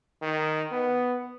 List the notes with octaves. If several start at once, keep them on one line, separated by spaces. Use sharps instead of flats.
D#3
B3